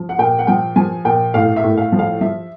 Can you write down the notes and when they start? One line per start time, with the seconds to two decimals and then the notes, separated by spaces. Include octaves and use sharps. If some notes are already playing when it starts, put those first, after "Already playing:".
Already playing: F3
0.09 F#5
0.18 A#2 G5
0.39 F#5
0.47 F3 G5
0.76 F3 G#5
1.05 A#2 G5
1.34 A2 F5
1.56 E5
1.64 A2
1.77 F5
1.92 F3
1.99 F5
2.21 F3 E5